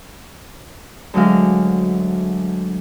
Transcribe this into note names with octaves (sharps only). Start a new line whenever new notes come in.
D2 F#3 G#3 F5